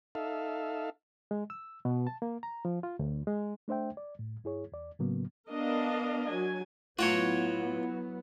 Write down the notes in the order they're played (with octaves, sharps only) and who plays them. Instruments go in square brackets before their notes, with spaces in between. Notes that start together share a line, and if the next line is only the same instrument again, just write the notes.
[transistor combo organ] D#4 A4 E5 F5
[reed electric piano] G#3
E6
B2
A5
A#3
A#5
F3
F4
D2
G#3
A3 D4 C5 E5 G5
D5
A2
G2 E4 G#4 C#5
E2 D5
A2 C#3 F#3 A#3 B3
[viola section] B3 D4 A#4 D#5 F5
F#3 G#5
[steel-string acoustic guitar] A2 [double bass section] F#3 B3 [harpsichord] F4 G5 [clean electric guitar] F#4 C#5